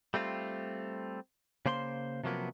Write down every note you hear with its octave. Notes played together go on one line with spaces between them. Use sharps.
G3 A3 C4 F4
C#3 A#3 C5 B5 C6
C3 F3 F#3 A#3 B3